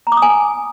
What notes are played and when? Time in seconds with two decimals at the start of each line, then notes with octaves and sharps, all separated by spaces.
0.07 A#5
0.12 D6
0.17 D#6
0.22 G#5